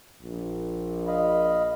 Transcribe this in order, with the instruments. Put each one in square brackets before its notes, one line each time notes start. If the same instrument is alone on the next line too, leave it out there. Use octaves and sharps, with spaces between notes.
[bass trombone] A#1
[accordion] D#5 F5 B5